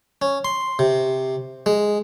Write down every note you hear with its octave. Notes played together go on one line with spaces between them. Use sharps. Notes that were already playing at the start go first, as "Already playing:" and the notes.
C#4
C6
C3
G#3